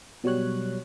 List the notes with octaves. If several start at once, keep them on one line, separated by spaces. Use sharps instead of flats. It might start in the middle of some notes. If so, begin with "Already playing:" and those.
B2 F#3 G3 C#5 F#6